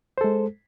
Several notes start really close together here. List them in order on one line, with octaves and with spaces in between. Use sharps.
C5 A4 G#3